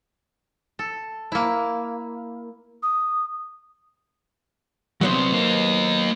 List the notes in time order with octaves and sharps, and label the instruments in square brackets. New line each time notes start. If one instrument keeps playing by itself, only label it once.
[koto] A4
A#3 E4
[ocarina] D#6
[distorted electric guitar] C2 C3 [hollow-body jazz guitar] F#3 B3 C5
[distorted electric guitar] A#3 D#4